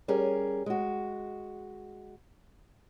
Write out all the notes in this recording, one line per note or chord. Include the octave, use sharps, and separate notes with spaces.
G3 C#4 G#4 A#4
G#3 F#4